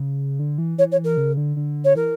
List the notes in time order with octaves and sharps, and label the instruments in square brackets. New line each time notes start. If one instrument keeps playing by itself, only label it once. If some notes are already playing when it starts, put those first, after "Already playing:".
Already playing: [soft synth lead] C#3
D3
E3
[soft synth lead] E3 [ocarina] C#5
[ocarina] C#5
A#4
[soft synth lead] C#3
D3
D3
[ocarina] C#5
[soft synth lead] E3 [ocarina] A#4